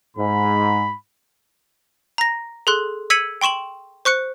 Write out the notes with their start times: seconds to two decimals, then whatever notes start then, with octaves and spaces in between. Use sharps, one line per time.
0.17 G#2 B5
2.18 A#5 A#6
2.67 G#4 A4 C6 F#6
3.10 E6 G#6 B6 C#7 D#7 F#7
3.41 G5 C6 C#6 E7 F#7
4.05 C5 C#6 F#6 C#7